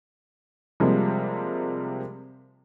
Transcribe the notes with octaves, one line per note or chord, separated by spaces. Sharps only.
C3 F3 G3 G#3 A#3